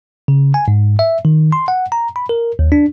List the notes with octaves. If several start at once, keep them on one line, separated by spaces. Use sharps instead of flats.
C#3
G#5
G#2
E5
D#3
C6
F#5
A#5
B5
A#4
D#2
D4